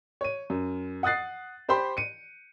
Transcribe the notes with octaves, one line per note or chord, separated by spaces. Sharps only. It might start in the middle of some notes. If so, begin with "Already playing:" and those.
C#5 D#7
F#2
F#5 D#6 F#6 A6 C7
G4 C5 G5 B5 C6
C#7 D#7